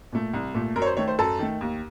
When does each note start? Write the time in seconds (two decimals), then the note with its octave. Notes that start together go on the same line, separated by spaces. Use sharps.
0.13 A#2 A3
0.33 C2
0.55 A#2 A3
0.76 F#2 A#4
0.82 C#5
0.86 C5
0.97 D#3 A3 C#5
1.08 C5
1.19 F#2 A4
1.39 D#3 A3
1.61 D#2